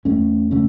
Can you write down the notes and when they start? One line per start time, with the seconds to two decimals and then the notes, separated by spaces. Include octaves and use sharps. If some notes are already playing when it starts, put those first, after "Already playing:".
0.05 E2 A3 C#4
0.51 C#3 A3 C#4